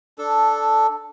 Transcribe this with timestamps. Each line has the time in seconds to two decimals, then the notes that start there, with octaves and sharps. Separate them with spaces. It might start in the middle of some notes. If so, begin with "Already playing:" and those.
0.18 D4 A4